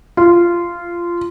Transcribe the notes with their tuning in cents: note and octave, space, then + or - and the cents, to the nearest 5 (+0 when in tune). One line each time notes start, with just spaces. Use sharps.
F4 -15